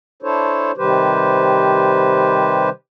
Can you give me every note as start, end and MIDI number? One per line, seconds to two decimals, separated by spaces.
0.22 0.71 62
0.22 0.71 64
0.22 0.71 69
0.22 0.71 72
0.22 0.71 73
0.77 2.69 48
0.77 2.69 51
0.77 2.69 55
0.77 2.69 67
0.77 2.69 71
0.77 2.69 72